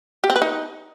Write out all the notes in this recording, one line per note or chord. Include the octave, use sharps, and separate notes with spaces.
G4
C4
B4
D#4